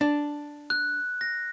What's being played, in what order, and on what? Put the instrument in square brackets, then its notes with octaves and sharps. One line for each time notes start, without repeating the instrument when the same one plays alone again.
[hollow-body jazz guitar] D4
[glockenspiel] F#6
A#6